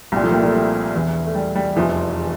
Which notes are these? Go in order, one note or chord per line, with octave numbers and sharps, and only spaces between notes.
C2 A#2 G3
F3 A3
G3 A#3
F3 A3
G3
E1 E2 E3
A3
G3
G3
F1 E2 E3 F3